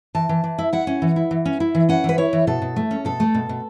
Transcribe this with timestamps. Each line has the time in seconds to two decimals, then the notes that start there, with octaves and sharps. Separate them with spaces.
0.15 E3 A5
0.29 E3
0.44 E3
0.58 E4
0.73 E4 F#5
0.87 C#4
1.02 E3
1.16 E4
1.31 E3
1.45 C#4
1.60 E4
1.75 E3
1.89 C#4 F#5
2.04 E3 B4
2.18 E4 C#5
2.33 E3
2.47 B2 A4
2.62 B2
2.76 A3
2.91 C#4
3.05 B2 A4
3.20 A3
3.35 B2
3.49 B2